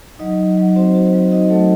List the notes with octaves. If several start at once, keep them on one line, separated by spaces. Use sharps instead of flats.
F#3 D#4 D#5
F#3
F#3
C4 F#4 C5
F#4
F#3
D#4 F#4 D#5
F#3 A3 A4